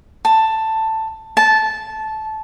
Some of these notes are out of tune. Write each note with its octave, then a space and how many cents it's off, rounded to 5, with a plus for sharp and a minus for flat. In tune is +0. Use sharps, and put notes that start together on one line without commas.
A5 +10
A5 -15